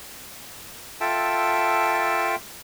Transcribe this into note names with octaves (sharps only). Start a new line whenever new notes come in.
F4 A4 E5 G5 A5